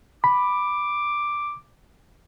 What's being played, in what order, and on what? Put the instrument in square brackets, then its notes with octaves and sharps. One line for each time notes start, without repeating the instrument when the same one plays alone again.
[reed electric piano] B5 [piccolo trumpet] D6